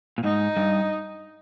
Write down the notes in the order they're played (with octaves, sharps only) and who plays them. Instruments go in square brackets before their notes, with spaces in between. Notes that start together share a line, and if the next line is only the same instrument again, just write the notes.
[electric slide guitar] A#2
[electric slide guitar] G#2 [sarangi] D#4
[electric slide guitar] G2